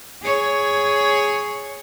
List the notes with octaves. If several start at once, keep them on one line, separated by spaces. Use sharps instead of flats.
G#4 C#5